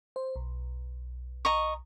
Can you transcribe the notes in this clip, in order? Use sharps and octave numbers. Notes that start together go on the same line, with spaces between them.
C5
B1
D#5 A#5 C#6